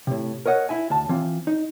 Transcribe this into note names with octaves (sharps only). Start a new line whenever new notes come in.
A2 C3
A#4 C#5 D#5 F#5
E4 E5 G#5
D2 A5
E3 C4 F4
D#4